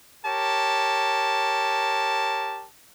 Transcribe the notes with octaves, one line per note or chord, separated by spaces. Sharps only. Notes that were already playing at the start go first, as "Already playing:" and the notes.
G4 A#4 C#5 A5